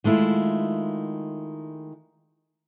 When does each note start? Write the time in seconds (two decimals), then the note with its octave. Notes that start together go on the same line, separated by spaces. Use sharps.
0.04 D#3 G#3 A3 E4 F4